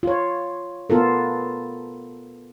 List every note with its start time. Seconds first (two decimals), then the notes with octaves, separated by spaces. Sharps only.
0.03 F4 C#5
0.90 B3 F4 A4 A#4